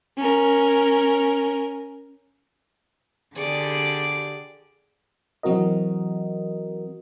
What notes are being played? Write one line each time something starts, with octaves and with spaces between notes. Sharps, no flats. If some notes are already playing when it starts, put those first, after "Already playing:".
C#4 A#4
D3 G4 G#4 D5 D6
E3 F#3 C4 F#4 A#4 D#5